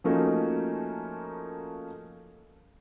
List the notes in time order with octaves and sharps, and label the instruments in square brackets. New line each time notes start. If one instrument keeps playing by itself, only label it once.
[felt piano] F3 A3 A#3 C#4 D#4 F#4